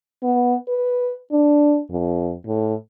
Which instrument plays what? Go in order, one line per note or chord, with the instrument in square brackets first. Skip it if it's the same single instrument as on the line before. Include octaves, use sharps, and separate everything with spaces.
[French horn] B3
B4
D4
F2
A2